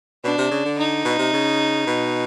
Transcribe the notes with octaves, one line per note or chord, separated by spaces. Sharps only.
B2 D4
C3
C#3
D3
D#4
B2
C3
C#3
B2